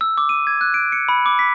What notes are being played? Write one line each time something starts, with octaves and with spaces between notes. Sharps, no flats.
E6
D6
D#7
G#6
F#6
D7
C#7
B5
D6
B6